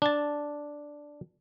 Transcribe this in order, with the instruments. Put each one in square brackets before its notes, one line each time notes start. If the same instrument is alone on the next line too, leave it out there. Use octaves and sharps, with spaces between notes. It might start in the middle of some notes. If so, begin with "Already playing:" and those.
[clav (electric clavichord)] D4 A5